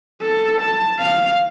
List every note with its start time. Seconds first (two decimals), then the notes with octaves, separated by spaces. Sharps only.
0.22 A4
0.61 A5
0.99 F5